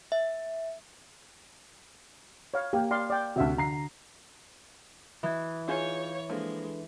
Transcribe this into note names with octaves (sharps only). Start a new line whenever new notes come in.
E5
C#5 F5
A#3 G4
D5 F5 C6
D5 G5
D2 C3 F#4 E5
D3 A#5 C7
E3 D#6 F#6 G#6
D#4 F4 G#4 C#5 E5 F5 G6
F3 G#3 A#3 D4 A4 B4